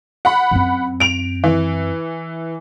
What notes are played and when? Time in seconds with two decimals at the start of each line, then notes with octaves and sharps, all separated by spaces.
0.25 F#5 B5
0.51 F#2 C4
1.00 D7 F7
1.44 E3